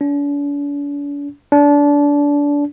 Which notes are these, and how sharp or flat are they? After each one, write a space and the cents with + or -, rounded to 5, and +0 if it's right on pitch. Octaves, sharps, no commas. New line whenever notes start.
D4 -45
D4 -25